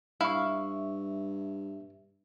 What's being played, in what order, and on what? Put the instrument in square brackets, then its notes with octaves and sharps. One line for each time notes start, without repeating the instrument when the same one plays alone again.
[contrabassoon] G2 [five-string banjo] E4 F5 [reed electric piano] E5 C#6